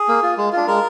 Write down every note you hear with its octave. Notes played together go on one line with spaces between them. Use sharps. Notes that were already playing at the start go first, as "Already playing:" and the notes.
Already playing: G#4
A#3
F4
G#3
D4 F4
G#3 A#4